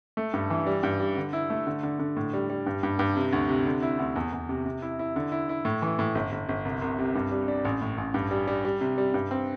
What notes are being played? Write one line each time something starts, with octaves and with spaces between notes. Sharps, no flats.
A3
G2
E3
G3
G2
G3
D3
E4
A3
D3
D3
D3
A2
G3
G3
G2
G2
G2
C3
D2
C3
D3
E4
D2
E2
E2
C3
C3
E4
E4
D3
E4
E4
A2
E3
A2
G1
G1
G1
C2
C2
C3
G2
G3
D4
A1
A2
A1
G2
G3
G3
G3
C3
G3
G2
C4